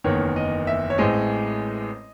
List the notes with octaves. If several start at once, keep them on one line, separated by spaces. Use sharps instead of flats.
F#1 E2 D#3 C#5
D#5
E5
C#5
A1 A2 G#3 C4 D#5